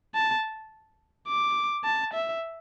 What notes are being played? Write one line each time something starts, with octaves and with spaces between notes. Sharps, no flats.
A5
D6
A5
E5